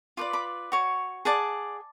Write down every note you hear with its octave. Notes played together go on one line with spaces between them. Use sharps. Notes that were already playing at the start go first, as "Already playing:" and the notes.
F4 B4 D5 D6
B5 D6
F#4 C#5
G#4 D5 F#5 A5